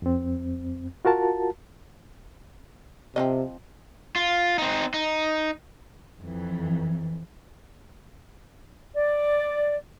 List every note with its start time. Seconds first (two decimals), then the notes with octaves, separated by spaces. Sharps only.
0.02 F2 C4
1.05 F4 F#4 A#4 A5
3.16 C3 F3 C4 D#5
4.16 F4
4.58 C4 D#4
4.94 D#4
6.18 F2 E3
8.94 D5